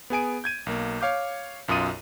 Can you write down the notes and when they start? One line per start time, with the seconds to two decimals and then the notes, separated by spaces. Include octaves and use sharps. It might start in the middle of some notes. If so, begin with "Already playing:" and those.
0.10 B3 G#4 G#5 D7
0.44 G6 G#6 D#7
0.66 B1 A#3
1.01 C#5 F5 D6 G6
1.68 B1 F#2 F4 D#6 D#7